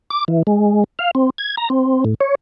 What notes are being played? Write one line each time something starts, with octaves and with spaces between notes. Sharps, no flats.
D6
E3
G#3
F5
C4
G#6
A#5
C4
A2
C#5